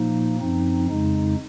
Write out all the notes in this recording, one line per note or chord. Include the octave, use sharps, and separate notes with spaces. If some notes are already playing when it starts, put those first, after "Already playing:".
Already playing: A#2 F3 A#3 D#4
F#2 F3 C4 D#4
F2 C#3 G#3 D#4